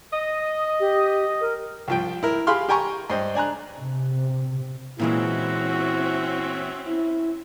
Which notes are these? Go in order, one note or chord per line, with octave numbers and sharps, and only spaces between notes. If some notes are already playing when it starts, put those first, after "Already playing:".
D#5
G4
A#4
C2 F3 G5
E4 A#4
G4 G#4 F5 B5 C6 F6
G4 G5 G#5 A#5 C#6
G2 C5 D#5
D4 G#5 A#5 F#6
C3
A#2 E3 G#3 C4 C#4 E4 F#4 E5
E4